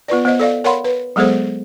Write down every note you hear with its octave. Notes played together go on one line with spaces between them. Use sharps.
B3 F4 B4 D5
B3 C5 D#5
A4 D5 F5
A#4 C#5 F5 F#5 B5 C6
B4
F#3 G#3 B3 G#4 A4 C5